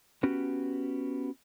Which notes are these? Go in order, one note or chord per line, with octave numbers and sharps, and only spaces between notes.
B3 C#4 F#4 G4